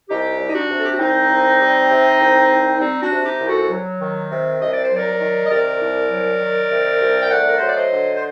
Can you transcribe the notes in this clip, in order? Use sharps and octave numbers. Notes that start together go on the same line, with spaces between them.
C2 D#4 G4
G3
D#4
D4 F#4
C3
A4
G4
F#4
C2 C4 D#4
C2
G3
C3
C2
C2
G3 C4 D#4
D4 F#4
C3
D#4 G4
C2
F#4 A4
F#3
D#3
C3
C2 D#5
D5
C5
F#3
A#4 D5
D#3
D#5
C3 A#4 D5
C2
F#3
D#3
C3
C2
G5
A3 D5 F#5
A#4
F#3 C5
D5
C5 D#5
D3
C5